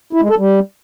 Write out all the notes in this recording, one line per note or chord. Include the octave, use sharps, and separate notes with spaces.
E4
G#3
A4
G3